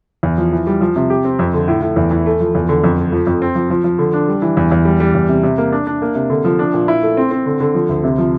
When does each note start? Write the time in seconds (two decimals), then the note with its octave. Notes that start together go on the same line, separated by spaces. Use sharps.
0.23 E2
0.38 F3
0.53 E3
0.67 G3
0.81 F3
0.96 C3
1.10 G4
1.25 C4
1.39 F2
1.54 D3
1.68 A2
1.82 A2
1.96 E2
2.11 E3
2.26 A3
2.40 F3
2.55 E2
2.69 D3
2.84 F2
2.98 A3
3.12 F3
3.27 F2
3.42 C4
3.55 F3
3.70 F3
3.84 F3
3.99 D3
4.13 D4
4.28 G3
4.42 E3
4.57 E2
4.72 E2
4.85 G3
5.00 G3
5.14 E2
5.29 C3
5.43 C3
5.58 A#3
5.72 D4
5.87 D4
6.02 A#3
6.15 C3
6.30 D3
6.45 F3
6.59 D4
6.74 A#2
6.88 E4
7.03 A3
7.17 C4
7.31 C4
7.46 D3
7.60 D3
7.75 F3
7.89 D2
8.04 C3
8.18 F3